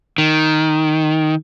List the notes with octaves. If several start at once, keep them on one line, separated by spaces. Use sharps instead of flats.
D#3